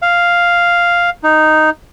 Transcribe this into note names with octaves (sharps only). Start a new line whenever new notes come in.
F5
D#4